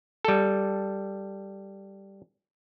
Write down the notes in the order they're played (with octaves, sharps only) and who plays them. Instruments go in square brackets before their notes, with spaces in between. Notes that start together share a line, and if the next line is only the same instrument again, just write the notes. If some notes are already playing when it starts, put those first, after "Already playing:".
[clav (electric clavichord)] G3 A4